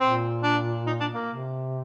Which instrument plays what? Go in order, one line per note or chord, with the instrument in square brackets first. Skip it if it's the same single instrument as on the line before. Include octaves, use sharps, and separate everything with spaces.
[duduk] A#2 [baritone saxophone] C4
[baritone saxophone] D4
D#4
D4
A#3
[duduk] C3